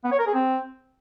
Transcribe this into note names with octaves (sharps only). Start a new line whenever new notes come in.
B3
C#5
A#4
G#4
C4